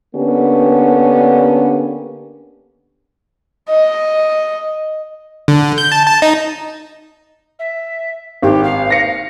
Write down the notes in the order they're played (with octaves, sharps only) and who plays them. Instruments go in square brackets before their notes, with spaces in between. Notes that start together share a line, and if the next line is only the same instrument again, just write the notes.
[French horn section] D3 A#3 B3 C#4 D4 G4
[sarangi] D#5
[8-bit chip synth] D3
G6
A5
A5
D#4
[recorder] E5
[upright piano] G#1 [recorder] G4
[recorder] F5
[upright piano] A#6 C#7